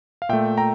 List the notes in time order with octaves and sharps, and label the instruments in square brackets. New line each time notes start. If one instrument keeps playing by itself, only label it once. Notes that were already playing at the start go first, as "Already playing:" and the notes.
[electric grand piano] F5
A#2 A3 E5 G5
G5 A#5